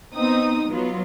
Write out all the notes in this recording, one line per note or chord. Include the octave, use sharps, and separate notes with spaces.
B3 C4 D#4 D#6
F#3 B3 F4